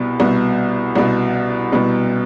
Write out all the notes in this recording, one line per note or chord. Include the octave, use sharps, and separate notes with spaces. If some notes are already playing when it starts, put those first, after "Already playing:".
Already playing: C2 B2 B3
C2 B2 B3
C2 B2 B3
C2 B2 B3